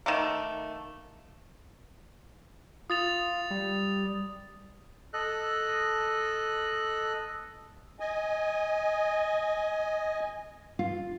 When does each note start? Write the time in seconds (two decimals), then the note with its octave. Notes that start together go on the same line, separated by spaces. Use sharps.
0.06 D#3 A3 A#3
2.90 F4 D#6 A6 F7
3.50 G3
5.13 A4 D#5 F#6
8.00 D#5 G#5
10.79 F4